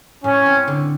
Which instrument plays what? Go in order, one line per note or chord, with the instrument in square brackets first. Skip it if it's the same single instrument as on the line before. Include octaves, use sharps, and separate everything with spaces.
[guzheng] A2 [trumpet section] C#4
[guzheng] C4
D3